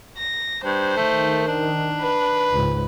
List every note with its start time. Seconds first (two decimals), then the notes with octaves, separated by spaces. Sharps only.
0.18 A#6
0.64 G2 C5
0.97 D#3 A3
1.48 D4
2.00 B4
2.52 C#2 G#2